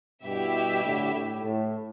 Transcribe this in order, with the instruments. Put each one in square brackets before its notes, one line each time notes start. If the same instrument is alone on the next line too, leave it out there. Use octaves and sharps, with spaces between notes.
[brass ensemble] G2 B2 [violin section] E4 G4 E5
[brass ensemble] A2 D3
A2
A2